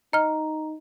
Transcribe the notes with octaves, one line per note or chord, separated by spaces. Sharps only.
D#4 D#5 A#5 F6